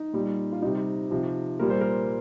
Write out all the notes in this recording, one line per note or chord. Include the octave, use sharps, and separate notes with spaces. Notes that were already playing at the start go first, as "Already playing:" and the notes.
Already playing: D#4
A#2 G3
F4
C3 G3 D#4
C3 F3
A#2 G3 A#4
C5
A#4